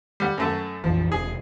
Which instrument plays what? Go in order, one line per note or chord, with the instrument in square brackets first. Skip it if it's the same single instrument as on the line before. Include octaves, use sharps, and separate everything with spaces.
[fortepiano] G3 F#5
F#2 A3 F#4
[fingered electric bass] A#1 F2 E3 [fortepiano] F3
[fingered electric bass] E1 C3 [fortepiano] G#4